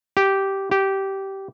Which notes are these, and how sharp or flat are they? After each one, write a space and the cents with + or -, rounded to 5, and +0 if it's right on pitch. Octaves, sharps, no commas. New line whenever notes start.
G4 -10
G4 -15